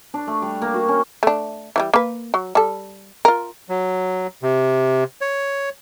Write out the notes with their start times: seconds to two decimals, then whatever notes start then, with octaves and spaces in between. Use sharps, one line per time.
0.14 D4
0.27 A3
0.42 G3
0.62 A#3
0.74 F#4
0.88 C#4
1.23 A3 D4
1.76 E3 F#3 G3
1.94 A#3 B4
2.34 F#3
2.55 G3 A4
3.25 F4 A#4
3.69 F#3
4.43 C3
5.21 C#5